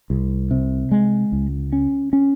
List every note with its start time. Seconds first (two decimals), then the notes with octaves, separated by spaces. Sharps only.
0.10 C2
0.51 C3
0.91 G#3
1.32 C#2
1.73 C#4
2.13 C#4